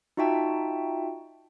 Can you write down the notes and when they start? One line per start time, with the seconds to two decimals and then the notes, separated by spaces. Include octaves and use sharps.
0.17 D#4 F4 F#4 E5 G5 A5